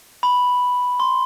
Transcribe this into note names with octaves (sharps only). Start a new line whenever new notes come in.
B5
C6